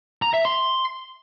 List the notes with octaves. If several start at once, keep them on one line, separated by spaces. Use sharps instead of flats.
A#5
E5
C6